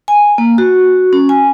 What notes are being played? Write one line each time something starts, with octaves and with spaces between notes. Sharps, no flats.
G#5
A#3
F#4
C#4
G#5